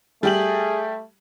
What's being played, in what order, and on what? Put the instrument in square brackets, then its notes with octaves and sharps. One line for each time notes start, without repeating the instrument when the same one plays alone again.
[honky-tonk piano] G3 G4 F#7 [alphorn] A3 [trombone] G#4